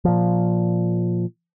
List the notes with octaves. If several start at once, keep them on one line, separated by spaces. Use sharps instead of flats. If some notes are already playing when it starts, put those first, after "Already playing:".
A#2 F3